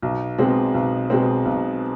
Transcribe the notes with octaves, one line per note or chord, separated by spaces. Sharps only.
B1
B2 G#3 C4
B1
B2 G#3 C4
B1